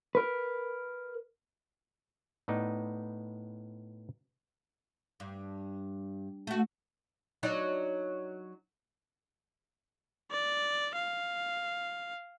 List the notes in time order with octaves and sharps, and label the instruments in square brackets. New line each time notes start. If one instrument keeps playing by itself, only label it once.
[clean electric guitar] A#4 B4
[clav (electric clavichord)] A2 B3 D#4 D5
[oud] G2
A3 F#4
F#3 D4 D#4
[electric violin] D5
F5